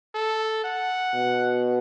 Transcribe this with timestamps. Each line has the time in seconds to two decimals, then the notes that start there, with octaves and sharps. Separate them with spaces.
0.15 A4
0.64 F#5
1.14 B2